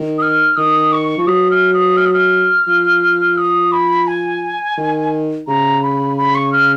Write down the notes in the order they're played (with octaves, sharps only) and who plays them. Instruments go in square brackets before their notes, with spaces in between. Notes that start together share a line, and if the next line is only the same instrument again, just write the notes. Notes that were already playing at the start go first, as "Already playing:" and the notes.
Already playing: [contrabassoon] D#3
[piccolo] D#6
F6
[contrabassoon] D#3 [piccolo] D#6
[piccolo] C#6
[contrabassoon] F3
[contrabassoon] F#3 [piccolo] D#6
[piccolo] F6
D#6
F6
D#6
F6
[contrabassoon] F3
[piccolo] D#6
B5
G#5
[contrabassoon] D#3
[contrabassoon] C#3 [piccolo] A#5
[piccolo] B5
B5
C#6
F6